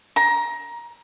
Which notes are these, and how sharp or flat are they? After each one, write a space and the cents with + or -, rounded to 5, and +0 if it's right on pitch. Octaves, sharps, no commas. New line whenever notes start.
A#5 +20